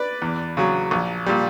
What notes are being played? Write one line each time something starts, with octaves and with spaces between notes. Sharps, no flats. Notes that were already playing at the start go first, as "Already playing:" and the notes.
Already playing: B4 D5
E2
C#3 F#3
A#1
A#2 G3